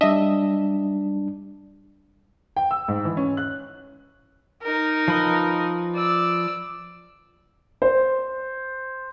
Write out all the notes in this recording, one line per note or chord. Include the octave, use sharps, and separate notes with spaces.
G3 D4 D#5 E5
G5
E6
G#2
E3
C#4
F#6
D#4 A#4
F3 B4 D#5
D5 E6
C5